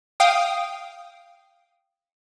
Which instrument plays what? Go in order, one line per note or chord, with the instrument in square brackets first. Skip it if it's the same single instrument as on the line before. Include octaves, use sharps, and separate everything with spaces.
[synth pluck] F5 G5 D#6